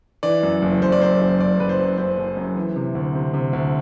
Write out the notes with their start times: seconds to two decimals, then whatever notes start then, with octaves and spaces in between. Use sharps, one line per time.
0.23 E3 D5
0.43 F#2
0.62 F#1
0.82 F#1 C5
0.92 D5
1.01 F#2 C5
1.21 F#1
1.40 F#1 D5
1.60 F#1 B4
1.69 C5
1.79 F#2
1.98 F#2 C5
2.18 F#1
2.37 F#2
2.56 E3
2.76 C3
2.95 D2
3.15 C3
3.34 C3
3.53 D2